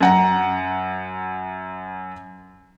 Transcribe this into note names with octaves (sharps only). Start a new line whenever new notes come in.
F#2 F#5 A#5